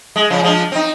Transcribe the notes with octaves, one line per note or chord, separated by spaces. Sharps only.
G#3
C#3 F3
F3 G#3 D4
C4 D#4